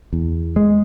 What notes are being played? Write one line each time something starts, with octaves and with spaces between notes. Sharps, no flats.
E2
G#3